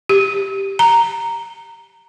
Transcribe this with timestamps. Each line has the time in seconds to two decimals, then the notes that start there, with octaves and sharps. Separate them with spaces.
0.09 G4
0.79 A#5